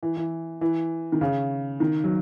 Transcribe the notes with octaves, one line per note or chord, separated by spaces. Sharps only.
E3
E3
E3
D#3
C#3
D#3
F#3